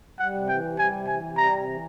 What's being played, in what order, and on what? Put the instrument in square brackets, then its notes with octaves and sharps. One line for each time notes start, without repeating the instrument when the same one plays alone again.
[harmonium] G3 [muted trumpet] F#5
[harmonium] C3
[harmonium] E3 [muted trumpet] G5
[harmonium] C3
[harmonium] G3 [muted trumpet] G#5
[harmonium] C3
[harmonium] E3 [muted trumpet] G#5
[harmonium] C3
[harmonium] G3 [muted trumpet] A#5
[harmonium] C3
E3